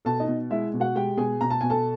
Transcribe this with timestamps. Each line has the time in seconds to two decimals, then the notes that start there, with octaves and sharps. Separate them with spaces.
0.05 B2 A4 A5
0.20 D#4 D#5
0.28 B2
0.51 G#3 E4 E5
0.73 B2
0.80 F#4 F#5
0.95 G#3 G4 G5
1.17 B2 G#4 G#5
1.41 B2 A#5
1.50 A5
1.61 B2 G#5
1.70 A4 A5